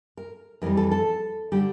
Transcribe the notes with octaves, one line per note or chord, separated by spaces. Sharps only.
A#4
F2 E3 G3 A#4
A4
A4
D3 G3 G4